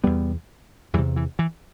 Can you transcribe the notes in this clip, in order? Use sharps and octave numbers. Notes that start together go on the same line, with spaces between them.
E2 C3 G3 B3
E2 C3 E3 G3
E3
E3